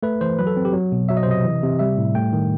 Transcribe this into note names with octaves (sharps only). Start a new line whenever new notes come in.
A3 B4
E3 C5
F#3 B4
A4
C4
G4
F#3
B2
F#3 E5
D#5
C5
C3 D#5
E3
C3
G3 E5
A2
A3 G5
D#3